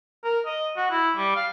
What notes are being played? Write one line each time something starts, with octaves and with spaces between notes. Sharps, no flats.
A#4
D#5
F#4
E4
G3
F5